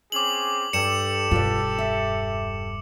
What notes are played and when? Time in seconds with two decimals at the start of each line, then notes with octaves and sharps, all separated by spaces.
0.12 C4 C#4 G#4 D6 F#7
0.73 G2 G4 A4 C#7 E7
1.31 E1 G2 F4 B4 D5
1.78 E5